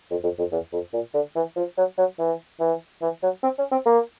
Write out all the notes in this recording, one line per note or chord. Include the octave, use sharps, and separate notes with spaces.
F2
F2
F2
E2
F2
A#2
D3
E3
F3
F#3
F#3
E3
E3
E3
F#3
C4
C#4
C4
A#3